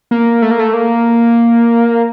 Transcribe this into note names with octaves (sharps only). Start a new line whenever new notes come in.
A#3
A3
A#3
A3
A#3